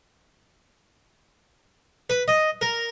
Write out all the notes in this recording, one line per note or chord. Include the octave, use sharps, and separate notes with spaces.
B4
D#5
A#4